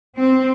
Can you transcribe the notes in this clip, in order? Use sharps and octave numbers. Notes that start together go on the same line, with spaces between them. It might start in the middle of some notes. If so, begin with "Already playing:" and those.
C4